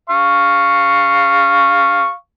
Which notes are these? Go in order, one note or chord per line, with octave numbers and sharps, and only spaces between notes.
F5 C#6